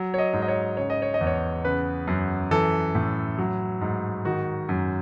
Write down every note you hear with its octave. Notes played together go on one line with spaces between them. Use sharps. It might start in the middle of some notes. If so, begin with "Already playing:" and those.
Already playing: F#3
C#5
D#5
G#2
D#5
C#5
C#3 C#5
D#5
C#5
D#5
E2
C#5
C#3 B4
F#2
E3 A4
A2
F#3
G#2
D#3 F#4
F#2